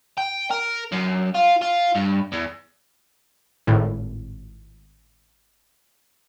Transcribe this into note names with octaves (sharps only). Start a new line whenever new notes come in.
G5
A#4
F#2
F4
F4
G2
E2
G#1 A2